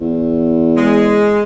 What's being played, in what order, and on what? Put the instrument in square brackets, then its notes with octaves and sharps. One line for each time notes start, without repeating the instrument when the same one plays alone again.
[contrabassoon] E2
[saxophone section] G#3